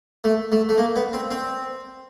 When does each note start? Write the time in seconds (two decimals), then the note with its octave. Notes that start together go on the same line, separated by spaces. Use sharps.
0.24 A3
0.52 A3
0.69 A3
0.78 A#3
0.96 B3
1.13 C4
1.31 C4